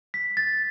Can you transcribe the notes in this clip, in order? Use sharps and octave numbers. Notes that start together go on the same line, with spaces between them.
B6
A6